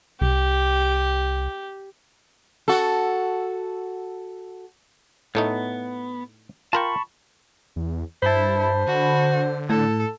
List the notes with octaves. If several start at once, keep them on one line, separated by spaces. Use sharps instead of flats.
C2 G4
F#4 A4
A2 A3 B3 D#4
F4 A#4 G5 A5 B5 C#6
E2
G2 E4 C5 A5 B5
D3 F#4
A2 A4